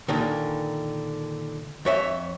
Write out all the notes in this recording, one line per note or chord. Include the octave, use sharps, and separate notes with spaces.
A#2 D3 D#3
F2 C#5 E5